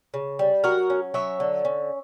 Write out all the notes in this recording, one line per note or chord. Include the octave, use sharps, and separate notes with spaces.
C#3
G3
F#3 F#4 A#4
C#4
F#3 C#5 E5
D3
C#4